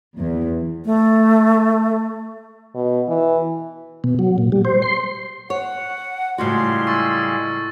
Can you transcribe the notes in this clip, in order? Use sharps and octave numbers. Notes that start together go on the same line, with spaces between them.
E2
A3
B2
E3
B2
F#3
A#2
G3
C5
C6
C#5 F#5
A2 C#3 G3 G#3 F4 F#4 C6
C#6 E6 A6